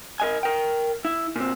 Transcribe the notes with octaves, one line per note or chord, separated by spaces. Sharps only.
A#4 D#5 G#5
A#4 G5
E4
A#2 C4